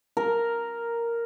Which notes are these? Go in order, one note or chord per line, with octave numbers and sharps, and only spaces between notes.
A#4